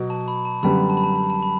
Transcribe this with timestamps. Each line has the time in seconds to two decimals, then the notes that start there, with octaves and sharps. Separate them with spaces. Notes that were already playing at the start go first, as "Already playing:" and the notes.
Already playing: B2 F#3 B3
0.10 A5
0.28 B5
0.45 A5
0.63 F#2 D3 G3 B3 B5
0.90 A5
0.97 B5
1.04 A5
1.15 A5
1.30 A5
1.43 B5